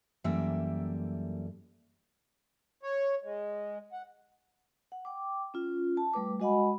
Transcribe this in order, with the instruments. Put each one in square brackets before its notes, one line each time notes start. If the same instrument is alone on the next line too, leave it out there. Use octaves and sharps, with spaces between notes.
[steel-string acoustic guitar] F#2 E3 G3 A#3 A4 E5
[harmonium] C#5
G#3
F#5
[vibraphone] F#5
G5 D6
C#4 F4
A5
G3 A3 B4 D6
G#3 F#4 D#5 F#5 G#5 B5